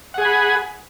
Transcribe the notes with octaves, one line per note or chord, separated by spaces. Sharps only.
G#4 F#5 G#5 B5